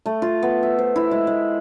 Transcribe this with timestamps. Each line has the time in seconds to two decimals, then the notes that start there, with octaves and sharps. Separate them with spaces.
0.06 A3
0.22 F4
0.43 B3
0.63 E5
0.79 C5
0.96 E4
1.11 G#3
1.27 G#3